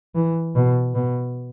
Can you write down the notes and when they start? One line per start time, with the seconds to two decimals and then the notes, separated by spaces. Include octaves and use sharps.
0.15 E3
0.55 B2
0.95 B2